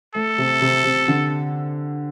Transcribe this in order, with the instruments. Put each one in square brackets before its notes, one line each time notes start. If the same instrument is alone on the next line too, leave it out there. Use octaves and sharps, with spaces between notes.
[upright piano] A3 [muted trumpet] A4
[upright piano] C3
C3
C3
D3